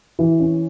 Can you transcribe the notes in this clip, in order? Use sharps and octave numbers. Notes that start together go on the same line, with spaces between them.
E3
C#4